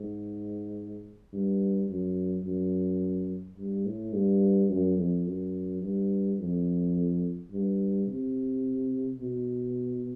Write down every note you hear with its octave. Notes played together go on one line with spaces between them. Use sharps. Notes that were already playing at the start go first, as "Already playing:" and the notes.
Already playing: G#2
G2
F#2
F#2
G2
A2
G2
F#2
F2
F#2
G2
F2
G2
C3
B2